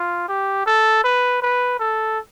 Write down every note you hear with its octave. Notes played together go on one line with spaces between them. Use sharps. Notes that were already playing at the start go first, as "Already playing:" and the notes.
Already playing: F4
G4
A4
B4
B4
A4